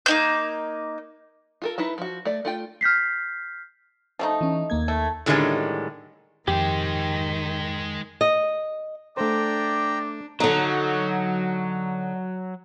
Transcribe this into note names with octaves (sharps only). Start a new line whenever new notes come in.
A#3 D#4 G6
F4 A4 A#4
D#4 E4 B4 A5
F3 F#4
A3 D5
A3 F4 G5
F6 G6 B6 C7
F3 A3 D#4
E3 C#4
D#2 A#3 G#6
A3
A2 D3 D#3 G3 G#3 C#4
F2 D#3 G#3 G4 C5 G5
D#5
A3 D4 C5 D5 G5 A#5
D3 F#3 D#4